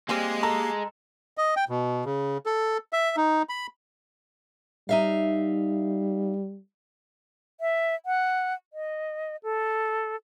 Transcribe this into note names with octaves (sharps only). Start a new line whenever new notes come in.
G3 G#3 A#3 C4 G4 G#4 C7
A4 A#5
D#5
G5
B2
C#3
A4
E5
D#4
B5
G3 D#4 E5 F5
E5
F#5
D#5
A4